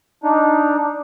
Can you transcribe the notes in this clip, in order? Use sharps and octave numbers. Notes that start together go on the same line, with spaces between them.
D4 D#4